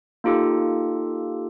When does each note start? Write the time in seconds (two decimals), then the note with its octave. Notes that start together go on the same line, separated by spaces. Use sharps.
0.24 A#3 D#4 F4 G4 A4